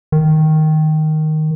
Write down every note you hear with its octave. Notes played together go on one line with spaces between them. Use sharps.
D#3